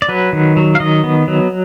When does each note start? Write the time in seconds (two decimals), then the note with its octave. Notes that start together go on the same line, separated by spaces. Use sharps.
0.02 D5
0.09 F#3 B4
0.33 D#3
0.57 F#3
0.75 F5
0.80 D#3 D#5
1.04 B3
1.28 F#3